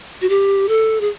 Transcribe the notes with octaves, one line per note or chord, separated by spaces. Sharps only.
F#4
G4
A4
G#4